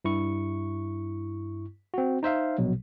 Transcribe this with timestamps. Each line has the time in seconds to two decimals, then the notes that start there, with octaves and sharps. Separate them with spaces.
0.04 G2 E4 C#6
1.94 C4 F#4
2.23 D#4 C5 E5 F5
2.58 A#1 B2 F#3